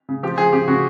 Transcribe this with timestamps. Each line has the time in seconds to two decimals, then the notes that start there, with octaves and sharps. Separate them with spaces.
0.09 C#3
0.23 F3 G4
0.38 F3 G#4
0.53 C#3 G4
0.68 C#3 F#4